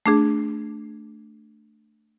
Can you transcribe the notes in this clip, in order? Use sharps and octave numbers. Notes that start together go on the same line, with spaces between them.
A3 D4 G#4